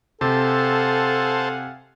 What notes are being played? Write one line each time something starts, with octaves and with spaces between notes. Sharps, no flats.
C3 A4 C5 F5 F#5 G#5 A5